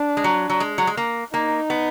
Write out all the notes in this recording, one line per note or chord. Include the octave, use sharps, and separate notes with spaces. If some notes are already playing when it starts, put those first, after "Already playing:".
Already playing: D4
G#3
F#3
F#3
G#3
F#3
G#3
A#3
A#3 D#4
B3